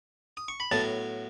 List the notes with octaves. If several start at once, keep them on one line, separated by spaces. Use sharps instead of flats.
D#6
C#6
B5
A2 F#3 B3 A5